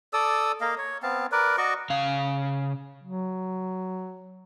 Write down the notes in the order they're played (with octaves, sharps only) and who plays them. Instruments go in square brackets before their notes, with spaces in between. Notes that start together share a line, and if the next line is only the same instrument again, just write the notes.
[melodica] A4 D5 D#6 E6
A#3 D#5 F5
C#5
B3 C4 F5 A5
A#4 B4 D5
F#4 D5 D#5 C#6
[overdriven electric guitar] C#3 F5
[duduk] F#3